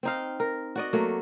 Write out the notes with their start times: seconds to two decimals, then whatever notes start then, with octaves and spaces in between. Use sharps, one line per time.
0.03 C4 D#4 F5
0.40 A#4
0.76 F#4 D5 D#5
0.93 F#3 A3 A#3